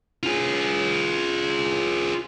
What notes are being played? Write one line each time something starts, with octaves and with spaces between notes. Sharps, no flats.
F4 G#4